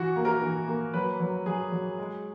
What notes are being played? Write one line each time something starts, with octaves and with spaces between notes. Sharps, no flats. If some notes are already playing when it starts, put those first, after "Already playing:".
Already playing: E3 E4 F#4
A#3
A#4
E3
A#3
F#3 B4
F#3
F#3 G#4
F#3
G#3